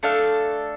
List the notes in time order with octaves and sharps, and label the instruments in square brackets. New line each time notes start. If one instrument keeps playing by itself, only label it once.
[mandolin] A3 D4 A4 F5